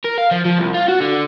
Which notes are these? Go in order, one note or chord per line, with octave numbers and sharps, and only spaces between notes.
A#4
F5
F3
F3
C2
F4
F#4
D3